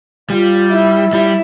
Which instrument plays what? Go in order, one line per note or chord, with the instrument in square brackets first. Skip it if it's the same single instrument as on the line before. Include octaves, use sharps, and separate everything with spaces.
[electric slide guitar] G3 [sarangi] F4
[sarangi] E4
[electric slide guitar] G3 [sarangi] E4